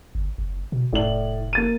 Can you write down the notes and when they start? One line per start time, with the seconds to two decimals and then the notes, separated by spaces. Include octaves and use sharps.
0.15 G1
0.38 F#1
0.72 B2
0.93 F1 A2 D5 F#7
1.53 A#3 A6 D#7